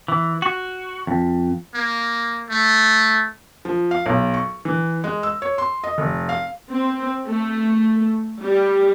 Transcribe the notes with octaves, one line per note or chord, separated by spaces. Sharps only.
E3
F#4
F2
A#3
A3
F3
F5
B1
C#6
E3
G#3
E6
C#5
C6
D#5
F1
F5
C4
A3
G3